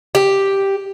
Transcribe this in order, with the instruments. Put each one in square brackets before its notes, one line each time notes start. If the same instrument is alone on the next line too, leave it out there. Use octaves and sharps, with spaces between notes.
[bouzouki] G4